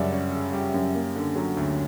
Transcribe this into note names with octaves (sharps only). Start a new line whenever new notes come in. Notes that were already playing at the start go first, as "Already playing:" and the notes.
Already playing: F#2 C#3 G3 C#4 D5 E5 F#5
C#4
C#3
G3 G4
F#2
A#3
D3
F#3
D2